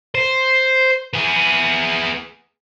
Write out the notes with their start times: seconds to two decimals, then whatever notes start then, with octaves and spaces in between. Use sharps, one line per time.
0.15 C5
1.13 B3 G#4